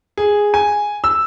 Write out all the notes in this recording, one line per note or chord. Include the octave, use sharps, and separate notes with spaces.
G#4
G#5
E6